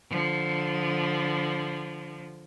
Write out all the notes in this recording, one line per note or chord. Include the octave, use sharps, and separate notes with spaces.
D3 F3